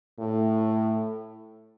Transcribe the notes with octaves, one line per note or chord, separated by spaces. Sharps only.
A2